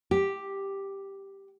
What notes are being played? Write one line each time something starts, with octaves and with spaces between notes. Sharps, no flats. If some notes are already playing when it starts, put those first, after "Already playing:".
G4